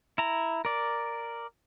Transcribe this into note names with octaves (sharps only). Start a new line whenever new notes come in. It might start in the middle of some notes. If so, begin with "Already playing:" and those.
E4 A#5
A#4 D5